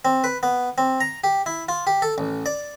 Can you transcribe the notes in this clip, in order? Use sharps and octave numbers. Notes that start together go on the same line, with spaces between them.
C4
B4
B3
C4
A#5
G4
E4
F4
G4
A4
A1
D5